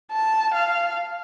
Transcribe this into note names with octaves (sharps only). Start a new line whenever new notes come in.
A5
F5